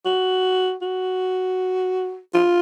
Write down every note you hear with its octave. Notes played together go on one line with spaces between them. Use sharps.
F#4
F#4
F4